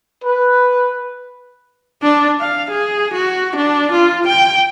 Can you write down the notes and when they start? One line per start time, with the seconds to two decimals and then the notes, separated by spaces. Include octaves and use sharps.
0.25 B4
2.03 D4
2.40 F5
2.71 G#4
3.14 F#4
3.56 D4
3.92 F4
4.27 G5